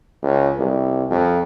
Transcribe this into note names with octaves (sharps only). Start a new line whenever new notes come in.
C#2
C2
F2